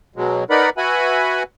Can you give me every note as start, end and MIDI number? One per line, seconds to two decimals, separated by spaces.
0.16 0.44 47
0.16 0.44 54
0.16 0.44 56
0.50 0.70 63
0.50 0.70 70
0.50 0.70 71
0.50 0.70 74
0.50 0.70 78
0.50 0.70 83
0.77 1.43 66
0.77 1.43 71
0.77 1.43 76
0.77 1.43 78
0.77 1.43 80
0.77 1.43 83